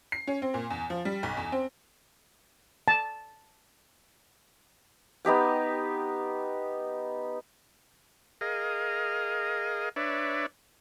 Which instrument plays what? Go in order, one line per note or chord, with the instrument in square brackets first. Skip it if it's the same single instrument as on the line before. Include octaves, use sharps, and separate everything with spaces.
[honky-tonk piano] C7
C#4
C4
A#2
E2
F3
G3
B1
E2
C4
[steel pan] A5
[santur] B3 D#4 G4 G5
[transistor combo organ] G#4 A#4 D#5 F5
D4 B4 C#5 D5 E5